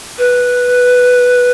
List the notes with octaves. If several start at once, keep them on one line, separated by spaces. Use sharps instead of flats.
B4